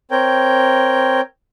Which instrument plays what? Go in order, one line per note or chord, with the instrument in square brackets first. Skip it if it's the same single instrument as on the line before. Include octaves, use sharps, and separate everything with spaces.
[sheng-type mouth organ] C4 A#4 C#5 G5